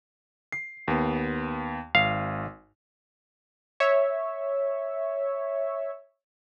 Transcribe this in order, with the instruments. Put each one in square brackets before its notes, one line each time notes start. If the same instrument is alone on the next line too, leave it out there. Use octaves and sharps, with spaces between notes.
[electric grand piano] C7
D#2 B3
[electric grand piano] G#1 [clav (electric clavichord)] F5
[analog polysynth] C#5 E5